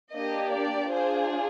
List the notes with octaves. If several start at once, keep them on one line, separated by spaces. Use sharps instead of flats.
A#3 D4 G4 D#5
D5
D4 F4 G#4 C5